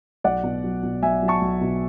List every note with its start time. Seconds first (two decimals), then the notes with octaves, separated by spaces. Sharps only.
0.24 B1 D5 F#5
0.44 B2
0.64 F#3
0.83 B2
1.02 B1 E5 G#5
1.22 F#3
1.28 A5 C#6
1.41 B1
1.61 B2